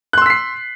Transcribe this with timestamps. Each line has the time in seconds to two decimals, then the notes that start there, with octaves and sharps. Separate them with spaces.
0.13 F#6
0.18 C6
0.22 E6
0.26 B6
0.30 C7